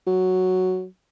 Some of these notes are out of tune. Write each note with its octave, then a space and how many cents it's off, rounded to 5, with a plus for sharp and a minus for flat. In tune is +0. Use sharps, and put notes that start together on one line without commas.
F#3 +0